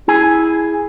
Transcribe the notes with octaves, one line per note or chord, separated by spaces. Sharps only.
E4 G#4 G#5